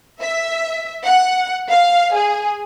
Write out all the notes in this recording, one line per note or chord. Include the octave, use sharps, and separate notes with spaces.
E5
F#5
F5
G#4